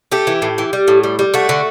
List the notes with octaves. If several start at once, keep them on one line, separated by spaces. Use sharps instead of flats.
A3 G4
E3
A2
E3
G3
A2
G3
G3
A3 F#4
D3